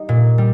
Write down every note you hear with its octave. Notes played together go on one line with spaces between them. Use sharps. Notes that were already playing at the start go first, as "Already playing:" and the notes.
Already playing: G3 D#4
A#2
G3